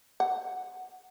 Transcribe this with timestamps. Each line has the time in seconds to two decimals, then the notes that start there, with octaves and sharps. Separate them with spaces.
0.20 F#5